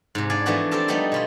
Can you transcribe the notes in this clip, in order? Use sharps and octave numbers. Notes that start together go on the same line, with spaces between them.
G#2 C3
D4 D5 F5 G#5
E3 F3 A3 B3 D4 F#4
C4 G4 A4 A#4 A5
F3 G3 A3 B3 D#4 G4
B2 G3 F4